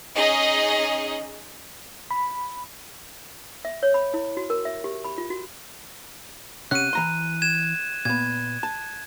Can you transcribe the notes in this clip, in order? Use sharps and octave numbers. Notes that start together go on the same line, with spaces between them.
C#4 D#4 G#4 D#5
B5
E5
C#5
B5
E4
F#4
A#4
E5
G4
B5
F4
F#4
C3 C#4 F#5 F#6 D#7
E3 A#5 C6
G#6 E7
A#2 B3 G#6
A5